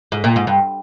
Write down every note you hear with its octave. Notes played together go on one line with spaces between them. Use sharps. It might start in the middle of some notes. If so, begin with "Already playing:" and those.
G#2
A#2
G#2
G2